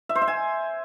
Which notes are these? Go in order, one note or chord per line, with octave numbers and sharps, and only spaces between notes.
E5
C5
E5
G#5